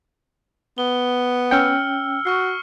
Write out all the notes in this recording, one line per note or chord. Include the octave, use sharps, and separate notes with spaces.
B3 G7
C#4 G5 E6 F6 C#7
F#4 C#6 F6 C7